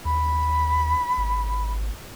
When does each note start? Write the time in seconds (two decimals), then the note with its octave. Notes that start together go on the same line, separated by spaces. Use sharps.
0.05 D#2 B5
1.18 G#1